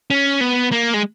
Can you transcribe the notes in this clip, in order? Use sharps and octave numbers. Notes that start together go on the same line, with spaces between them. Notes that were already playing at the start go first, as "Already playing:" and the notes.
C#4
B3
A#3
G#3